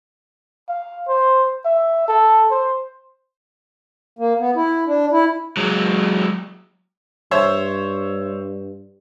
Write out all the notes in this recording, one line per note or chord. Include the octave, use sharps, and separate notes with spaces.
F5
C5
E5
A4
C5
A#3
B3
E4
D4
E4
F#3 G#3
G2 C5 C#5 E5